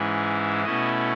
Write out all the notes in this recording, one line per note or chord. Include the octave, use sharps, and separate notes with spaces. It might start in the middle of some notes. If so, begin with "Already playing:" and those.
Already playing: G#2 E3 G#3 C#4 E4
B2 A3 C#4 E4 D#5